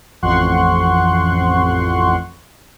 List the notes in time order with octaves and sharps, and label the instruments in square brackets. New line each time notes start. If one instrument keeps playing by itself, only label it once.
[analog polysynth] A1 F2 F#5 C6 C#6 F#6